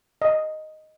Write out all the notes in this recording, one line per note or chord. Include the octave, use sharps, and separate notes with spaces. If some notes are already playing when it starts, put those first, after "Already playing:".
D#5